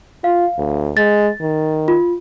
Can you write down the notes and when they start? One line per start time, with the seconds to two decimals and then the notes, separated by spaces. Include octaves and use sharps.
0.24 F4 F5
0.58 D2
0.97 G#3 A6
1.41 D#3
1.88 F4